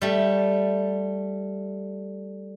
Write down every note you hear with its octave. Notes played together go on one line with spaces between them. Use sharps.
G3 A3